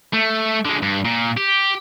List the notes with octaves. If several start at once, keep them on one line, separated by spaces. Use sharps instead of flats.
A3
D3 G#3
G2
A#2
G4